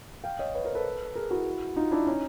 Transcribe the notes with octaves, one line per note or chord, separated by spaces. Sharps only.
F5 G5
C#5 D#5
B4 C#5
A#4 C5
A4 B4
G#4 A#4
E4 F#4
D#4 F4
D4 E4
C#4 D#4